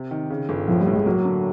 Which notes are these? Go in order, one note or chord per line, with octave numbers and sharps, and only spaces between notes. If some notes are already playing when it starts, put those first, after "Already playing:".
Already playing: C3
D#3
C#3
G1
A2 F3
G3
A2
G#3
F#3 A#3
D3